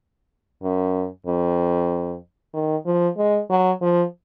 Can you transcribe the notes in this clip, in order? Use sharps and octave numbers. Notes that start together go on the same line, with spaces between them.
F#2
F2
D#3
F3
G#3
F#3
F3